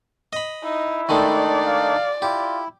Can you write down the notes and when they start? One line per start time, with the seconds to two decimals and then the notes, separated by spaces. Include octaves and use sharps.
0.33 D#5 B5
0.64 D#4 E4
1.09 D#3 G#3 A3 D4 D#4 D5
1.66 F5
2.22 E4 F4 G4